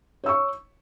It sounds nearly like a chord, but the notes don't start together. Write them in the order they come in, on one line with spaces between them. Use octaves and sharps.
C#5 E6 C#6